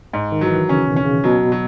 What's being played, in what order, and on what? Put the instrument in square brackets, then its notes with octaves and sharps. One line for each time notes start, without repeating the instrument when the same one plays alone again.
[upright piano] G#2
[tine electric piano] D#3
[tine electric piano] E3 [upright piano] F#3
[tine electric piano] D#3
[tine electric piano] C#3 [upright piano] C#4
[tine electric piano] B2
[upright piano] C#4
[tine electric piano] C#3
[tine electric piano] B2 [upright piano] F#3
[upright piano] F#3